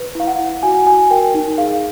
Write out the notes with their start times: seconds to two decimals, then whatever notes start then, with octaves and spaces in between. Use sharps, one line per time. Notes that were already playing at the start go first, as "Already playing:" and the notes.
Already playing: B4
0.15 E4 F5
0.27 F#5
0.39 E4
0.63 F#4 G#5
0.86 F#4 G#5
1.10 A#4 G5
1.34 D#4
1.58 G#4 F5